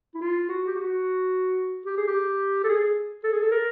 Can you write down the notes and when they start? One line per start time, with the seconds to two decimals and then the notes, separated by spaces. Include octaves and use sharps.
0.14 E4
0.21 F4
0.49 F#4
0.67 G4
0.76 F#4
1.86 G4
1.97 G#4
2.07 G4
2.64 A4
2.69 G#4
3.24 A4
3.32 G#4
3.42 A4
3.51 A#4